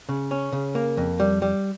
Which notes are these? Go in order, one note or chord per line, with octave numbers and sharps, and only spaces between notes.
C#3
C#4
C#3
A#3
F2
G3
G3